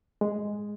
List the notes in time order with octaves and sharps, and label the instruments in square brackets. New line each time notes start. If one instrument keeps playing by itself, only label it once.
[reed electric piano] G#3